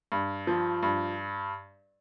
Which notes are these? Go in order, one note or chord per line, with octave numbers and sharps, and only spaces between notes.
G2
F3
G2